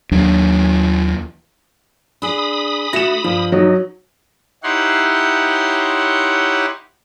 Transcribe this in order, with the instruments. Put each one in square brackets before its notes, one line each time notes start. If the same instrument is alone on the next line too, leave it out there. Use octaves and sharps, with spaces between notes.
[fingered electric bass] D#2 F#3 D4
[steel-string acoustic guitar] D4 G#4 [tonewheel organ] B5 D#6
[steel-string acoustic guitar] A3 F#4 F#5 [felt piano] A#6 E7
[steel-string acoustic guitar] G2 [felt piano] F3
[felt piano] F#3 [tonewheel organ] D#4
[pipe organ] D#4 E4 G4 C#5 F#5 C6